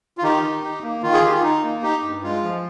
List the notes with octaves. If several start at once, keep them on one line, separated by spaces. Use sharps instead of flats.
F4
D#3 D#4 G4
D#3
D#4
A#3
D#3 F4
G#4
D#3 G4
F4
D#4
A#3
D#4 G4
G2
G#3 F4
F3